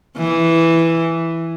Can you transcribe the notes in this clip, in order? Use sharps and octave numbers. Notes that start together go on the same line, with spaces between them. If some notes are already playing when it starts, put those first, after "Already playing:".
E3